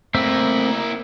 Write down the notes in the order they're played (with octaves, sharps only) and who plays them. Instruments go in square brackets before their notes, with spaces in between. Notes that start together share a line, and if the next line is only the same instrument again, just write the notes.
[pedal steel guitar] A3 C4 E5 [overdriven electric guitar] A#3 E4